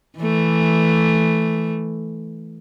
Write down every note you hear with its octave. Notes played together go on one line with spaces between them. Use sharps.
E3 A3